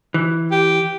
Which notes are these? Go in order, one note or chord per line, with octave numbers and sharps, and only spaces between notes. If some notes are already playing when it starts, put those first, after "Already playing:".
E3
G4